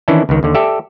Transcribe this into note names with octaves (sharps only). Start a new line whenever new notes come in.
D#3 E3 C#4 D4 E4
C#2 D#3
D#2 D3
G4 A4 D5 E5